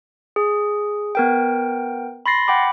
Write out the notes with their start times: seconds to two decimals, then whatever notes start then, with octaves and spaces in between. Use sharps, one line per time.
0.36 G#4
1.15 B3 A#4 G5
2.26 B5 C6 A6 A#6 C7
2.48 F#5 G5 B5 D6